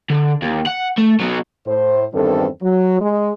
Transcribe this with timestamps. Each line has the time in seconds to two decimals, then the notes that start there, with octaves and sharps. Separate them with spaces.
0.10 D3
0.42 D#2
0.66 F#5
0.98 A3
1.20 F#3 B3
1.66 A2 C5
2.14 E2 G2 D#3 C4 A4
2.62 F#3
3.01 G#3